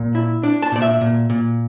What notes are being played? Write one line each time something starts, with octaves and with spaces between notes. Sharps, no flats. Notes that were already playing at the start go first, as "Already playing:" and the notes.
Already playing: A#2
E4
D4
A5
A#2 D5
E5
A#2
A#2